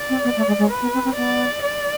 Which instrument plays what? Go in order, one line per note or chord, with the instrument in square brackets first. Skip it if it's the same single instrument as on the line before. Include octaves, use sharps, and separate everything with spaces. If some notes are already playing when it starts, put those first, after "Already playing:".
Already playing: [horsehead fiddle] D5
[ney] C4
B3
A3
G#3
G#3
[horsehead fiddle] B4
[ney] B3
C4
C4
[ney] B3 [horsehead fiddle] D5
[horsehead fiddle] D5